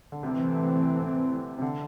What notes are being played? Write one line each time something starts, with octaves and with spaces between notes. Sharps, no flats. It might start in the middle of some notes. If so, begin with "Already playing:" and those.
D3
C2 C3 E3 A3 C4
C3
D3